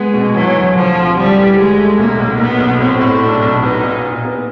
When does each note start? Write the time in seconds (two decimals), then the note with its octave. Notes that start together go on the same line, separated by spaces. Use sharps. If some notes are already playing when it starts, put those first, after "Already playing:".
Already playing: G#3 B3
0.14 B2
0.34 E3 F#3
0.56 D2
0.76 D2 F3
0.96 C3
1.17 D2 G3
1.38 E3
1.58 D2 G#3
1.78 A3
1.98 B1 A#3
2.19 B1
2.40 B1 B3
2.60 B1
2.80 A2 C4
3.01 A2
3.21 B1 D4
3.42 B1
3.63 B3 D#4
3.83 A#2
4.04 A#2
4.25 B3